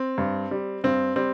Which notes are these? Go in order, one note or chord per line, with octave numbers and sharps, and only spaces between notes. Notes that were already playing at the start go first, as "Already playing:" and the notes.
Already playing: C4
G2
G3
G2 C4
G3 C4